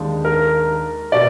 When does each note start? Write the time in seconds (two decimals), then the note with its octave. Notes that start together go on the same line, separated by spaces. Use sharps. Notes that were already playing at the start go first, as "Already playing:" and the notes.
Already playing: D#2 G#3 D4
0.25 A#4
1.12 B2 D5